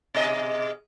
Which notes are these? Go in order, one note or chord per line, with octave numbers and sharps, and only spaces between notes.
B2 G#4 D#5